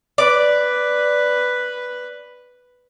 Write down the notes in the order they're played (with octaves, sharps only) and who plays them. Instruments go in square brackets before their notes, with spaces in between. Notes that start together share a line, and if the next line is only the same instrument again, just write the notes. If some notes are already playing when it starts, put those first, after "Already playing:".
[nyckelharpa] B4 [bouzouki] D5